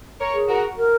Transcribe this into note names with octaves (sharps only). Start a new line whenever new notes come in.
A#4 C#5
G#4
F#4 A#4
A#4